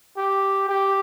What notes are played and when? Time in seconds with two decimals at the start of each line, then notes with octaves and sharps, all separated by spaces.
0.17 G4
0.69 G4